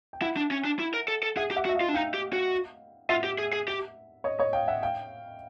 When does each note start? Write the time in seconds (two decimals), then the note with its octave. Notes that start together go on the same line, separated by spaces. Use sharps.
0.13 G5
0.21 E4 E5 F#5
0.37 D4
0.51 C#4
0.65 D4
0.79 E4
0.94 A#4
1.08 A4
1.23 A4
1.36 G#4 E5 F#5
1.51 G4
1.56 E5 F#5
1.65 F#4
1.69 E5
1.75 D#5 F5
1.81 F4
1.89 D4
1.94 D#4 F5 G5
2.14 G4
2.33 F#4
3.09 F4 E5 F#5
3.24 G4
3.38 G#4
3.53 G#4
3.68 G4
4.24 C#5 D#5
4.39 C#5 D#5
4.53 F5 G5
4.68 E5 F#5
4.82 F5 G5